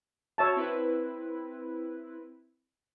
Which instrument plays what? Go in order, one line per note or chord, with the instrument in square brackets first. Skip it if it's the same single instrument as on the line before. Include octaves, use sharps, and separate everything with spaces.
[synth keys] F#4 [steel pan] C#5 E5 A5
[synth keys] C4 E4 B4